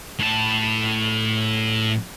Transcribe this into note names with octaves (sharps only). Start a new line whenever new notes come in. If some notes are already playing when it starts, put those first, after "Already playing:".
A2 A5